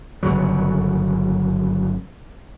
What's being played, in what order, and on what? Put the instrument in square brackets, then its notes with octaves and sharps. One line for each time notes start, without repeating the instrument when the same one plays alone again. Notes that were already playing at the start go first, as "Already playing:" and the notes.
[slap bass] G1 F#2 C#3 F#3